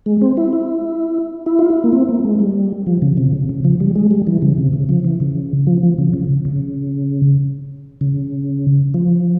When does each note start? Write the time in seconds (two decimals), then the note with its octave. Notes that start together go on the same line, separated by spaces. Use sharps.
0.06 G#3
0.22 C4
0.37 E4
0.53 E4
1.46 E4
1.59 F4
1.70 E4
1.84 A#3
1.92 C4
2.09 A#3
2.24 G#3
2.40 G3
2.87 F3
3.02 C#3
3.17 C3
3.33 C#3
3.49 C#3
3.64 F3
3.80 G3
3.96 G#3
4.11 G3
4.27 E3
4.42 C#3
4.58 C3
4.73 C#3
4.89 F3
5.04 E3
5.20 C#3
5.67 F3
5.83 F3
5.98 C#3
6.13 C#3
6.45 C#3
8.01 C#3
8.94 F3